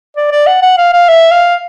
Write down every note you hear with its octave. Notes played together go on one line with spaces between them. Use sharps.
D5
D5
F#5
F#5
F5
F5
E5
F5